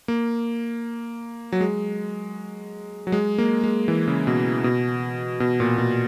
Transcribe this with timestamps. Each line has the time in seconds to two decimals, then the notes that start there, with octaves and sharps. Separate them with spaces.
0.08 A#3
1.52 F#3
1.61 G#3
3.07 F#3
3.12 G#3
3.38 A#3
3.64 G#3
3.88 E3
4.08 C#3
4.27 B2
4.64 B2
5.40 B2
5.60 A#2
5.78 B2